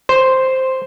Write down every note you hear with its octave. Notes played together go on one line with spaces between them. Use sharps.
C5